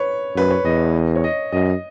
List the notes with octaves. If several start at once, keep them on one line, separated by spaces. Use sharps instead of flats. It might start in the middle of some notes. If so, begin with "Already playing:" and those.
Already playing: B4 C#5
F#2 B4
C#5
E2 D#5
C#5
D#5
F#2 D#5